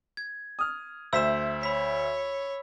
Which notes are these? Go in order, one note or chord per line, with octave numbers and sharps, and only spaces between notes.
G#6
D#6 F6
D2 C5 E5 E6 B6 E7
C#5 B5 B6